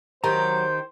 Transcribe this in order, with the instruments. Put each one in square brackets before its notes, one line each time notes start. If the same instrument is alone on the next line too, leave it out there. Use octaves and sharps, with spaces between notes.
[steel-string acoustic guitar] D#3 G4 [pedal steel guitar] F#3 A#5 [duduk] C5